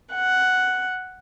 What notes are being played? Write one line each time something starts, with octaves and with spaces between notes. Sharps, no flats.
F#5